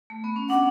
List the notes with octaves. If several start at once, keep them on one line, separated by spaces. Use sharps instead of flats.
A3
B3
C#4
D4 F#5